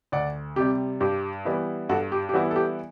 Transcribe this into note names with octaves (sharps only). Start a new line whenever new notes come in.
D2 D5 F#5
C3 G3 G4
G2 G4
E3 G3 B3 E4
G2 F#4 A4
G4
G4
E3 G3 B3 E4 F#4
A4
G4